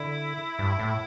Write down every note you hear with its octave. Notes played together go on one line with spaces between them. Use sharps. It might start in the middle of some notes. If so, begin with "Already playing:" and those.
Already playing: D3 E4
G2
A2